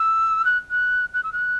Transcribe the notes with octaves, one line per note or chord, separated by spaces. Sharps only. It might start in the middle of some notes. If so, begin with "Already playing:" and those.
Already playing: E6
F#6
F#6
F#6
E6
F#6